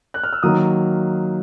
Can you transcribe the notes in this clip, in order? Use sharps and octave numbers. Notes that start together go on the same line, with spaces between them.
F#6
F6
E6
D#3 F#3 A#3 D#6